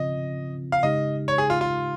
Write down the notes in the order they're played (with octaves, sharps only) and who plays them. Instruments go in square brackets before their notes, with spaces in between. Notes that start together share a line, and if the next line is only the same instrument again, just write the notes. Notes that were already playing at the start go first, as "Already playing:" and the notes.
Already playing: [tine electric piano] C#3 F3 C4 F4 [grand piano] D#5
[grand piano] F5
[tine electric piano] C#3 G#3 D#4 G4 [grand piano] D#5
[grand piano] C#5
G#4
F4
F4